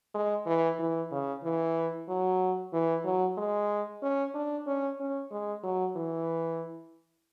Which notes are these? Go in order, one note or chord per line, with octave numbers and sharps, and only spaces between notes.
G#3
E3
E3
C#3
E3
F#3
E3
F#3
G#3
C#4
D4
C#4
C#4
G#3
F#3
E3